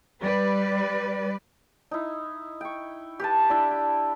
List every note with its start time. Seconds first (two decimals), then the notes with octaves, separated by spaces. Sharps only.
0.22 G3 B4 D5
1.91 D#4 E4
2.61 G5 C#6
3.20 G4 B4 A5
3.50 D4 E4
3.71 G5